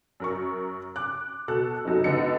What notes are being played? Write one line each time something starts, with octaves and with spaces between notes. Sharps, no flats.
F#2 A#4 C#6
D6 F#6
B2 A4 F#6
F#1 C3 F#3 D#4 A4
C#2 D3 B3 D#5 C#7